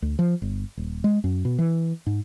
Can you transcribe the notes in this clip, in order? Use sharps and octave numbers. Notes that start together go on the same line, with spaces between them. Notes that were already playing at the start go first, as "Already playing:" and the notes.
D2
F3
G1
D#1
G#3
F#2
B2
E3
G#2